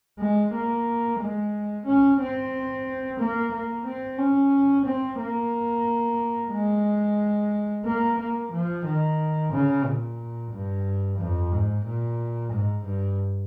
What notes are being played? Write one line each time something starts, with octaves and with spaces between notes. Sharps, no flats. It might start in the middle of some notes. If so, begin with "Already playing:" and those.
G#3
A#3
G#3
C#4
C4
A#3
A#3
C4
C#4
C4
A#3
G#3
A#3
A#3
F3
D#3
C#3
A#2
G2
F2
G#2
A#2
G#2
G2